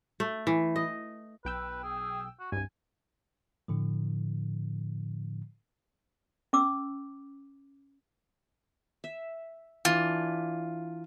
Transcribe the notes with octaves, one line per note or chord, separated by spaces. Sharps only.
A3
E3
D#5
B1 B4 G5 E6
G#4
F#4
C2 G2 G#5
A2 D3 F3
C#4 D6 E6
E5
E3 D4 F4